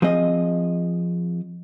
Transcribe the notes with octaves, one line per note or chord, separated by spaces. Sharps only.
F3 C4 G#4 D#5